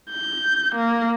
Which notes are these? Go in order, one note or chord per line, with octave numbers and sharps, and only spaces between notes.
G6
A#3